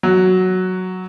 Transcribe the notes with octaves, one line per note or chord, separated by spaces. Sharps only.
F#3